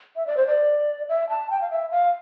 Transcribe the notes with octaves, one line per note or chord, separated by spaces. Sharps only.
E5
D5
C5
D5
E5
A5
G5
F5
E5
F5